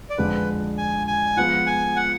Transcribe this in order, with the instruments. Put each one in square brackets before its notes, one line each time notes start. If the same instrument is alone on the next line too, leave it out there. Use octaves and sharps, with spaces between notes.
[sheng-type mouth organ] D5
[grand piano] F2 D3 F3 G#3 D4 [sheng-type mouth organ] B4
[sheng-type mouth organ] G#5
G#5
[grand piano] F3 G#3 B3 F4 [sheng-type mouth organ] F#5
[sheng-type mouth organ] G#5
F#5